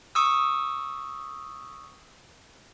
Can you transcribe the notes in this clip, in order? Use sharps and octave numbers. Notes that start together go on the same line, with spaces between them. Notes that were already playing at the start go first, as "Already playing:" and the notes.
C#6 D#6 E6